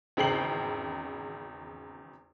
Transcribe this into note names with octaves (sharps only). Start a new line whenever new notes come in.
G#1 E2 C#3 G5 C7 F#7